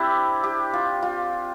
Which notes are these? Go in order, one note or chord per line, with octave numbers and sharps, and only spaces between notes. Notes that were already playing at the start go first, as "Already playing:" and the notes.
Already playing: C4 D4 E4 G4
G4
F4
F4